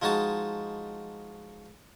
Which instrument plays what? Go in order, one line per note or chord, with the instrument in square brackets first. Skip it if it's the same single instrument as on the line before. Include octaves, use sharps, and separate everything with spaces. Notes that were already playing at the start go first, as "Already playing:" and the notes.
[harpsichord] F3 G#3 D#4 F#4 A5